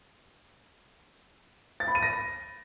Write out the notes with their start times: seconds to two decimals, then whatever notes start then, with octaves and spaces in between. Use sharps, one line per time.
1.80 A6
1.88 B5
1.95 D#7
2.03 A#6